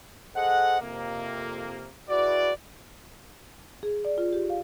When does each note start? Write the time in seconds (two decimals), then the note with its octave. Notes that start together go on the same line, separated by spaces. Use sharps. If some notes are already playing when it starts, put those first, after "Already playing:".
0.36 G#4 A4 C5 D#5 F#5
0.81 F2 C3 A#3
2.10 E4 F#4 G#4 B4 D5
3.83 G#4
4.05 D5
4.18 F4
4.33 G4
4.50 F5